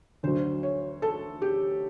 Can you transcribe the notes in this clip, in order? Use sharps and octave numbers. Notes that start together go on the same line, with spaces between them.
D2 D3 F#3 C5
C#5
A4
G4